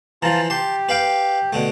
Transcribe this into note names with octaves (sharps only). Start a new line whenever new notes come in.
E3 F3 F4 A5 A#5
G4 A5 C6
B4 F5 G5
B2 D3 A3